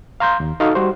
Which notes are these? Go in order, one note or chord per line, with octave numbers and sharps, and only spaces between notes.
F5 A#5 C6 G6
D#2
D#4 F#4 A4 F5
G3 F#4 C5